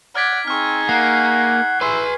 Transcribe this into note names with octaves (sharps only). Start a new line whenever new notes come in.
D5 F#5 F6 G#6 B6
C4 D#4 G#4 C#6 F6
A#3 F#5 C7
E4 G#4 B4 C6